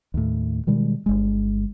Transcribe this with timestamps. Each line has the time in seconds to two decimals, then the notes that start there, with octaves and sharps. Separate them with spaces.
0.14 D#2 A2
0.67 B2 D#3 G3 G#3
1.06 G1 G#3